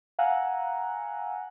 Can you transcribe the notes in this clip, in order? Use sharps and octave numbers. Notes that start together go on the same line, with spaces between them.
F5 F#5 G#5 A#5 E6 F#6